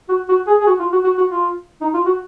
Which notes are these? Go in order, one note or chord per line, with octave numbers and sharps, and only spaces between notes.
F#4
F#4
G#4
G#4
F#4
F4
F#4
F#4
F#4
F4
D#4
F4
F#4